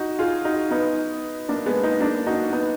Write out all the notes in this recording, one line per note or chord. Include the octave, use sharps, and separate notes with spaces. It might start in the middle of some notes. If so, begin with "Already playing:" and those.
Already playing: D#4 F#4
F4 G#4
D#4 F#4
B3 D#4
A#3 D4
G#3 B3
B3 D#4
A#3 D4
D#4 F#4
B3 D#4